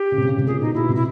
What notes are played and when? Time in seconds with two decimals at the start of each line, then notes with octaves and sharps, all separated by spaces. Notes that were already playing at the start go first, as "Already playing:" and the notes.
Already playing: G4
0.12 C#3
0.18 C3
0.27 C#3
0.38 C3
0.47 A#2 G#4
0.61 B2 D#4
0.75 B2 E4
0.89 C3
0.95 E4